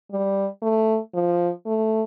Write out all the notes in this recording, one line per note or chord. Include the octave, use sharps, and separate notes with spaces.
G3
A3
F3
A3